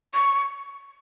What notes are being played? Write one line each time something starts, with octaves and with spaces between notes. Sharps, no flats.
C#6